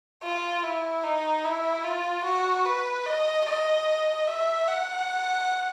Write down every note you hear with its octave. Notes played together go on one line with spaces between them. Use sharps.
F4
E4
D#4
E4
F4
F#4
B4
D#5
D#5
E5
F#5